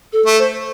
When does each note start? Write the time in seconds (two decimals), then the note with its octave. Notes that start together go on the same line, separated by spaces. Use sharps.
0.13 A4
0.26 A3
0.39 C5